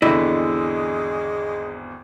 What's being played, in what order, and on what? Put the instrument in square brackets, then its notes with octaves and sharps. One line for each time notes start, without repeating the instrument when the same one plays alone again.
[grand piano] G#1 E2 D3 [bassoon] G#3 [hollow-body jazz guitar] E4 D#5